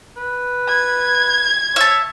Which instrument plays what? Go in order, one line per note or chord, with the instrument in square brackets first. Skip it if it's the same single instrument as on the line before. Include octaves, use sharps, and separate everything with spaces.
[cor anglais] B4
[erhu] G#6
[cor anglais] C#5 [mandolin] E5 A5